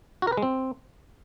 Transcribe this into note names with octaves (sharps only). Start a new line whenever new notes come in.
F#4
A#4
B4
G#3
C4